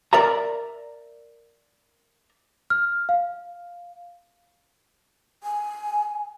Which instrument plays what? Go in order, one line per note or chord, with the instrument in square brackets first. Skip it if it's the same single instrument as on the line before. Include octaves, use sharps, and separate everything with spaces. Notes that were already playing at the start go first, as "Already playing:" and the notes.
[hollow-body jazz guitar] A#4 D5 E5 A#5
[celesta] F6
F5
[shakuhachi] G#5